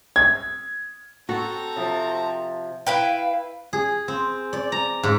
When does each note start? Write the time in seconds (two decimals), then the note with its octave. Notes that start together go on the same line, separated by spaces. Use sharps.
0.16 G#6
1.29 C4 F#4 A4 A#5
1.76 C3 F3
2.87 E4 B4 F5 G5
3.73 G#4
4.08 C4
4.53 D5
4.72 A#5
5.03 G#2